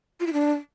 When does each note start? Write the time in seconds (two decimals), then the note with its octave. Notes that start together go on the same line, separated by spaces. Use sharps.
0.20 F4
0.27 E4
0.33 D4